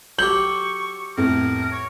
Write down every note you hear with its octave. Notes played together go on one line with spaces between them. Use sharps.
F#3 G4 A4 C#6 G6 F#7
F2 A2 B3 A#4
C#5